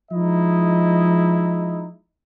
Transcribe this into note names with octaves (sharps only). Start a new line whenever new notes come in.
F3 G#3 D#4 E4 D#5